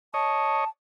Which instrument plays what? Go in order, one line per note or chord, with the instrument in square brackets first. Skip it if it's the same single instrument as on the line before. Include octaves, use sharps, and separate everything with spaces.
[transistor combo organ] C#5 D#5 [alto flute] A5